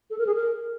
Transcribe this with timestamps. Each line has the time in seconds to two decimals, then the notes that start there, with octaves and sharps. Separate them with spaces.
0.10 A4
0.18 A#4
0.27 G#4
0.35 A#4